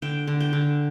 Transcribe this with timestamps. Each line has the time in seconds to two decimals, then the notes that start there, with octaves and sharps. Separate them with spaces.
0.02 D3 G5
0.27 D3
0.40 G5
0.53 D3